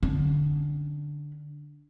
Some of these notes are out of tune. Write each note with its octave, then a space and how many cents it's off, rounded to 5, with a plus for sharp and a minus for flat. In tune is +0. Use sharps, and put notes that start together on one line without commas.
D3 +0 C#4 +0